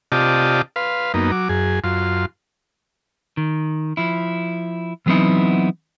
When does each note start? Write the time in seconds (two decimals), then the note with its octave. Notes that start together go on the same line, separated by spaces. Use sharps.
0.12 C3 F4 G4 D5 D#5 A5
0.76 B4 F5 C6
1.14 F#2 A#3 B3 D#4
1.32 F#3 D6
1.49 F#2 G#4
1.84 F#2 F4 C6
3.37 D#3
3.97 F3 E4
5.06 E3 F#3 B3 C4 D#4 E4